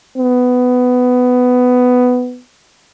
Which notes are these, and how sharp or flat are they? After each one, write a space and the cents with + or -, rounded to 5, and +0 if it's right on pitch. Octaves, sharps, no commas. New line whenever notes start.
B3 +15